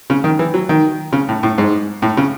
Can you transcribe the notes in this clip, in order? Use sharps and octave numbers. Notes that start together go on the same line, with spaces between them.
C#3
D#3
E3
F#3
D#3
C#3
A2
A2
G#2
A2
C#3